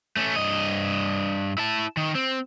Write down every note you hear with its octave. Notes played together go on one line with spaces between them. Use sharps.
A3 C#4
G2 D#5
E4 A5
D#3
C4